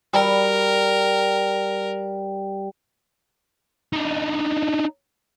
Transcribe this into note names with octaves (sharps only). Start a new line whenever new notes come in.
G3 A#4
D4 D#4